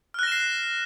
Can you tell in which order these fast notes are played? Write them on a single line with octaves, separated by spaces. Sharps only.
F6 F#6 A#6 E7 C7